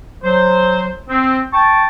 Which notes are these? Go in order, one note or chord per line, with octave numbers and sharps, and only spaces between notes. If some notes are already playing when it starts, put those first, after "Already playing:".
F#3 C5
C4
G5 A5 C#6